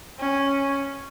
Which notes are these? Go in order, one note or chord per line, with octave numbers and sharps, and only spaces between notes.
C#4